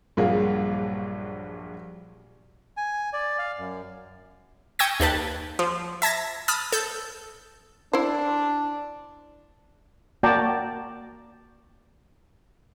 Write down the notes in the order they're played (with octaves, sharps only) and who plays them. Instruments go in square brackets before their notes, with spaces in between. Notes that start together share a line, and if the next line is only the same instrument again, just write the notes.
[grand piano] A#1 G2 F#3 A#3 G#4
[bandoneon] G#5
D5
F5
F#2
[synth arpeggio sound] G5 C#6 D#6 E6 G#6 A#6
D#2 G4 B4 A5
F3
E5 A5 G#6 A#6
A5 B5 D#6 F6
A4 G6
[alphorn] D4 [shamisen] E4 C5
[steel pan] A#3 F#4 D5 G5 A5 A#5